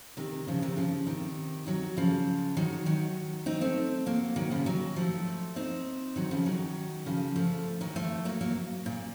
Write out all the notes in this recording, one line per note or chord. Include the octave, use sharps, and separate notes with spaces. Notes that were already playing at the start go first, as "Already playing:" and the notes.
C3 D#3
C#3 F3
C3 D#3
C#3 F3
C3 D#3
D#3 F#3
C#3 F3
D#3 F#3
D#3 F#3
C4 D#4
A3 C4
F#3 A#3
D#3 F#3
C#3 F3
D#3 F#3
F3 A3
C4 D#4
D#3 F#3
C#3 F3
D#3 F#3
C#3 F3
F3 A3
D#3 F#3
F3 A3
F#3 A#3
F#3 A#3
A#2